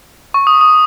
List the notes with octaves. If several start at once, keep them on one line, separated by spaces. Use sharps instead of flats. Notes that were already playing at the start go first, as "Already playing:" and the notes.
C#6
D#6
D#6